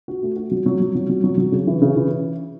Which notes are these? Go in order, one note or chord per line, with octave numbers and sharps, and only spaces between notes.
F#4
A3
F#4
F#3
F#3
F#3
F#3
F#3
F#3
F#3
C#3
E3
C#3
E3